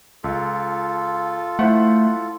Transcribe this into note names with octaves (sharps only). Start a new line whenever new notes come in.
C#2 F4 A4
A3 E4 C5 F#5